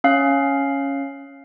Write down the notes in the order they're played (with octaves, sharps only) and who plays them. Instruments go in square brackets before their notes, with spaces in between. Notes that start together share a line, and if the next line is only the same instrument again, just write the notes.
[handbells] C#4 F5